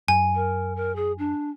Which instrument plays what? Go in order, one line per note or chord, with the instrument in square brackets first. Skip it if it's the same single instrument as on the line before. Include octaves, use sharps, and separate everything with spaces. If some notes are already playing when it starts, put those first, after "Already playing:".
[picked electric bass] F#2 [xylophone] G#5
[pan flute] A#4
A#4
G#4
D4